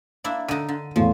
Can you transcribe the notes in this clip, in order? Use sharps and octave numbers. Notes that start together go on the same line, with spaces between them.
A#3 D4 E4
D3 D#4 D#7
D3
E2 A2 F3